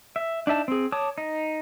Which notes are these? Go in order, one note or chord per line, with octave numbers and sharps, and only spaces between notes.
E5
D4 D#4 E5 A5
C4 G#4
C#5 A5 D6 D#6
D#4